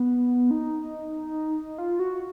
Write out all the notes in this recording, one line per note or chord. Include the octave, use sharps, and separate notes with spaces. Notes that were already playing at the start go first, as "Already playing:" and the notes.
Already playing: B3
D#4
F4
F#4